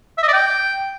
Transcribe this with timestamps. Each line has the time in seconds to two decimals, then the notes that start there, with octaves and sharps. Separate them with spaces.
0.18 E5
0.23 D#5
0.28 D5
0.33 G5